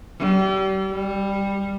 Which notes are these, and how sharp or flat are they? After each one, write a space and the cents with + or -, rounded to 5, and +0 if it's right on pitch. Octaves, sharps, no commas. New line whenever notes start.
G3 -35
G3 +15